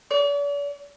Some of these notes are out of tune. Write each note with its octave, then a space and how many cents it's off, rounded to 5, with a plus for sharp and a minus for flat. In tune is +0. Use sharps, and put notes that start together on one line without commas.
D5 -45